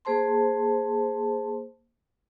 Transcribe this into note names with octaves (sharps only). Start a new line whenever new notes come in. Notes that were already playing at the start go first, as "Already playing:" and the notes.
A#3 G#4 C5 A5 C6